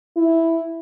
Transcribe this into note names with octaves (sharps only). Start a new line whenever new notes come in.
E4